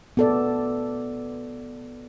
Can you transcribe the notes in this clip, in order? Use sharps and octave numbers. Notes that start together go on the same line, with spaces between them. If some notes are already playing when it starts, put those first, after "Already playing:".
B3 A4 D5